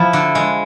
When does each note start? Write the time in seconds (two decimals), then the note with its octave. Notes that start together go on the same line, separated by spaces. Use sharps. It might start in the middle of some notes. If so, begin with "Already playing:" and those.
Already playing: F3 E4
0.13 D3
0.35 G#3